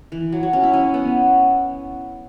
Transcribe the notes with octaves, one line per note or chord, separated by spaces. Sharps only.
E3
F#3
F#3
C#4
E4
C#4
B3